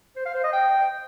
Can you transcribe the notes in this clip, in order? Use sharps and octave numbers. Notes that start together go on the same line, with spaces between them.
C5
F5
C5
D#5
G5